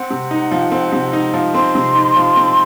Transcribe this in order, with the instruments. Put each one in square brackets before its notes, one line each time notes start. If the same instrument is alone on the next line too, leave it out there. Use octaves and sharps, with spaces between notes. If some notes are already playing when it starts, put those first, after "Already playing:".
Already playing: [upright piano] C4 [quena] F#5
[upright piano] C3
D#4
F3
C4
C3
D#4
F3
[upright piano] C4 [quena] C6
[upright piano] C3
D#4
F3
C4